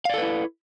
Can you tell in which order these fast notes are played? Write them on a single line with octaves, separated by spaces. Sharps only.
F5 D5 A4 B4 E4